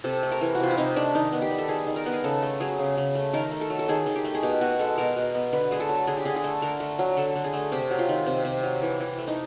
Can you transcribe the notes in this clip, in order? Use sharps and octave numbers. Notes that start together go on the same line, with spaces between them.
C3 A4
A3
A#4
E3
F#4
C3 F4
E4
C3 D#4
A3 D4
D#3 D#4
B3
G4
G3
A4
D#3 G#4
D#3
A#4
B3
G#4
C#3 A4
A3
F#3 G#4
C#3
C#3
A3
D#3 A#4
A3
A4
F#3
A4
D#3 G#4
D#3
G4
A3
G#4
B2 G4
B3 F#4
G#3 A4
B2 A#4
B2
B3
D3 B4
A3 G#4
A4
F#3
D3 G#4
G4
D3 G#4
G#4
A3 A4
D3 A#4
A3
F#3
D3 A4
D3
G#4
A3
C3 G4
F#3
F4
D#3
C3
C3
F#3
E3
E3
A3
D#4